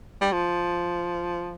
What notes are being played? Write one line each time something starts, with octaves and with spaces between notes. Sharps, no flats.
G3
F3